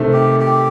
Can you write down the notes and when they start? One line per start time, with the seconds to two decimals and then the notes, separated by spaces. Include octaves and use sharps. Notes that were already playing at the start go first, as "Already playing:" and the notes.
Already playing: C3 D#3 A3
0.13 G4
0.40 G4